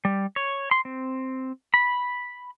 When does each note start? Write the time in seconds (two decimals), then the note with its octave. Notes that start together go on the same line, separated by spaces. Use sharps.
0.05 G3
0.36 C#5
0.71 C6
0.85 C4
1.74 B5